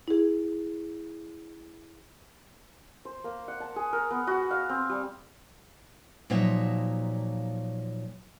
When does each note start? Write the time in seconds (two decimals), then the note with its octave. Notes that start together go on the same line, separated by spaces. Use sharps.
0.08 E4 G#4
3.05 C5
3.24 A#3
3.48 F#5
3.60 A5
3.76 G#4
3.93 A#4
4.11 B3
4.27 F#4
4.51 F5
4.69 C4
4.89 G3
6.30 A#2 F3 F#3 D#4 C#5 E5